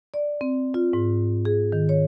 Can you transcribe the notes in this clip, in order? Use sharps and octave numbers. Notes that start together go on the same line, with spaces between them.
D5
C4
F4
G#2
G#4
D#3
C#5